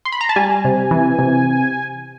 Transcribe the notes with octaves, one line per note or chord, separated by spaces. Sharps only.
C6
B5
A#5
A5
G3 G#5
C3
E3
C3